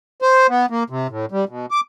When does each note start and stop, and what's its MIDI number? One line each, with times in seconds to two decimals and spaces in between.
0.22 0.47 72
0.49 0.66 59
0.70 0.84 58
0.90 1.07 48
1.10 1.26 45
1.32 1.45 55
1.49 1.66 47
1.71 1.81 86